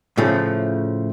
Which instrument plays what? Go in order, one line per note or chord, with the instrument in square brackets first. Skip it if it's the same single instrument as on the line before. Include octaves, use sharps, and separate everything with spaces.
[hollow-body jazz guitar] A2 C#3 F3 A3